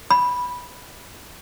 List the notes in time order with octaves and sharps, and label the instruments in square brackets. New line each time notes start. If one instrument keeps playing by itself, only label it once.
[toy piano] B5